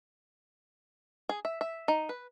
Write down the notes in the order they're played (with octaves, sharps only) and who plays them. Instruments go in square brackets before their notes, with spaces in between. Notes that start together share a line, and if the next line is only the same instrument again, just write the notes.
[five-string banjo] G#4
E5
E5
D#4
B4